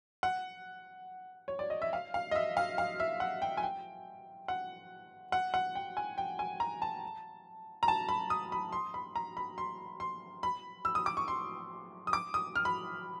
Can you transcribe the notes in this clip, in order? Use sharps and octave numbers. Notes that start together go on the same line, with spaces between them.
F#5
C#5
D5
D#5
E5
F5
F5
D#5
E5
F5
F5
E5
F#5
G5
G#5
G5
F#5
F#5
F#5
G5
G#5
G5
G#5
A#5
A5
A#5
A5
B5
D#6
B5
C6
B5
A#5
B5
C6
C6
B5
E6
D#6
D6
C#6
C6
D#6
D6
D#6
F6
B5